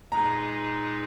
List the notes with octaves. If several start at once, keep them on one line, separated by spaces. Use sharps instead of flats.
A#2 G#3 D#4 G#4 B4 A#5